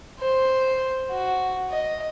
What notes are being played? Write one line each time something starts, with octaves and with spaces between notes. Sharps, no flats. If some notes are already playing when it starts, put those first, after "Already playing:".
C5
F#4
D#5